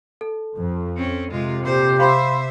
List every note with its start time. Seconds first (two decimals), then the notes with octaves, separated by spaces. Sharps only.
0.21 A4
0.58 F2
0.96 C4 C#4
1.30 C3 G#3 F4
1.63 A#2 G4 C5
1.99 C5 E5 F5 B5 C6